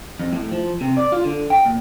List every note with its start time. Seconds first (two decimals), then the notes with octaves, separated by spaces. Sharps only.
0.19 F2
0.33 A2
0.51 F3
0.81 C3
0.97 D5
1.12 F4
1.24 D3
1.50 G5
1.65 A#2